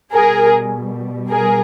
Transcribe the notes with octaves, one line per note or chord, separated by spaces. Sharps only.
B2 G3 G#4 A#4
G#4 A#4